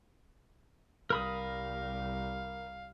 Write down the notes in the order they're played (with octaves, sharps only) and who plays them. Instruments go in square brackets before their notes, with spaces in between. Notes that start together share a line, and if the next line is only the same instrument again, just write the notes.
[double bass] C2 G3 [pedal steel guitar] A#4 B5 D#6 [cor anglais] F5